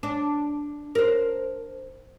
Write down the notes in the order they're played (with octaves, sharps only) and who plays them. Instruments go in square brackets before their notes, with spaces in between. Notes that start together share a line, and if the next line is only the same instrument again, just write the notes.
[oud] D4
A#4 C5